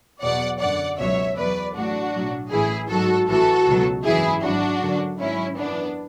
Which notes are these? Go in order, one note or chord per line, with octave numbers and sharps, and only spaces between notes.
E2 B2 F#3 D5 F#5
F#2 D3 F#3 D5 F#5
C#2 B2 F#3 C#5 E5
E2 B2 F#3 B4 D5
A1 A2 F#3 D4 F#4
B1 A2 F#3
A1 A2 E3 E4 G#4
G#1 G#2 F#3 F#4 A4
A1 A2 E3 F#4 A4
C#2 B2 F#3
G#1 F#2 E3 E4 G#4
G#1 G#2 F#3 D4 F#4
F#2 D3 F#3
G#1 G#2 F#3 C#4 E4
F#2 E3 B3 D4